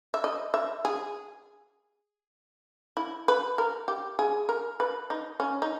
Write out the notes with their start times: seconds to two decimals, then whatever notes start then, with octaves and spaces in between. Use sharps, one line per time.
0.14 E5
0.24 D#5
0.54 E5
0.85 G#4
2.97 E4
3.28 B4
3.58 A#4
3.88 G4
4.19 G#4
4.49 A#4
4.80 B4
5.10 D#4
5.40 C#4
5.62 D#4